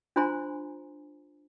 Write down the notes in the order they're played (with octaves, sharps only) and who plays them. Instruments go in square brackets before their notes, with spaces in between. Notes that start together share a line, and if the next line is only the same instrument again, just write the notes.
[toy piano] D4 F4 C5 G#5 A#5 C6